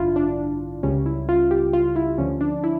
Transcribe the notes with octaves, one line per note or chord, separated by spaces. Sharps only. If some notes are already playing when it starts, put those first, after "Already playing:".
Already playing: A1 G2 D3 D4 E4 F4
D4
C#2 C#3 G3 C#4
E4
F4
G4
F4
E4
D2 D3 F3 C#4
D4
E4